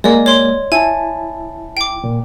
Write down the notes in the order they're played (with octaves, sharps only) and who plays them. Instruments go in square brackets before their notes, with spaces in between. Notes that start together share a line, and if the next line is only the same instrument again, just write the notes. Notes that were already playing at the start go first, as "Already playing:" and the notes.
[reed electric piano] G#3 A#3 [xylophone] D5 D#5
[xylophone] C#5 C6
[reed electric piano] E4 A5 [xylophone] G#5
[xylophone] G5 D6
[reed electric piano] A#2